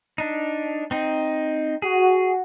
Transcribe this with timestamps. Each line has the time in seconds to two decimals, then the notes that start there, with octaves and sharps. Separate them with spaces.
0.18 D4 D#4
0.91 C4 D#4
1.82 F#4 G#4